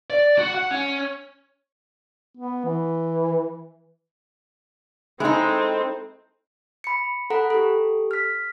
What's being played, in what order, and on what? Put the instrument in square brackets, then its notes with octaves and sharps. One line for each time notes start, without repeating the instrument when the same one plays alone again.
[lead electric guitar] D5
F#4
F#5
C#4
[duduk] B3
E3
[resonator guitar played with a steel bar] G#3 D#4 [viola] C4 [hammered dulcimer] E4 A4 C5
[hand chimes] B5 C#7
A4 F#5 A#5 B5
G4 A4
F6 B6